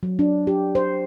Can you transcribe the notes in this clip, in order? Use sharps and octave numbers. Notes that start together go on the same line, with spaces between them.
F#3
D4
G4
C5